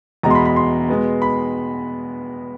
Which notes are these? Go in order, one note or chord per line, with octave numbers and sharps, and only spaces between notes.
E2 B2 G#3 A#5
C6
B5
B5
C6
B2 G#3 B3
B5